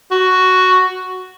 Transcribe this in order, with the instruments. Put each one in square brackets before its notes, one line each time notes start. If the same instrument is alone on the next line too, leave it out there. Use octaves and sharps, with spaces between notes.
[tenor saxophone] F#4